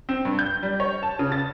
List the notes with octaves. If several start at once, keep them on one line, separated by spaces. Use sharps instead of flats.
C4
G2
G6
G3
C#5
A5
C#3
A6